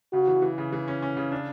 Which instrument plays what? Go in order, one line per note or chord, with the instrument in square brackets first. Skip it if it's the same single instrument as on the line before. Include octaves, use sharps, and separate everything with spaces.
[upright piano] C#3 [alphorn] F#4
[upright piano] E3
E3
C#3
E3
C#4
C#4
C#3
D4